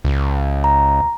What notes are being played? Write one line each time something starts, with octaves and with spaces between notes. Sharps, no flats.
C#2
A#5